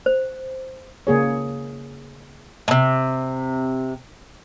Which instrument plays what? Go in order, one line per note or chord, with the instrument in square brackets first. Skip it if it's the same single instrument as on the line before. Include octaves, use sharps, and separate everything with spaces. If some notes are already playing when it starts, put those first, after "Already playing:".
[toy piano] C5
[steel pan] C#3 A#3 G#4 C#5
[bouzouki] A2 C3